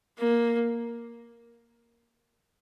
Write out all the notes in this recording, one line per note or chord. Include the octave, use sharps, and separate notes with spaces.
A#3